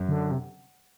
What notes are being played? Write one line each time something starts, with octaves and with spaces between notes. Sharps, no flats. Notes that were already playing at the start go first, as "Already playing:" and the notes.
Already playing: F#2
D3
C3